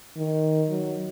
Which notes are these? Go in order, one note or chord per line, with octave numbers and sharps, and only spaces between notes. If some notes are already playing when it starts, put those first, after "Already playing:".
D#3
F#3